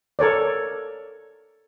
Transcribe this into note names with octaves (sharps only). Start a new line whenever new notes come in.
A4 A#4 C#5 D5